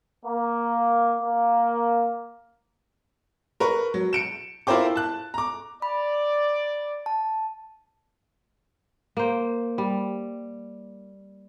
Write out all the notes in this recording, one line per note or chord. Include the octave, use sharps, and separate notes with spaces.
A#3
A#3
A#4 B4 C#6
F#3
C#7 D7 E7
E4 F4 A#4 C5 G5 D6
A5 F#6
A#5 D6
D5 B5
A5
A#3 C5
G3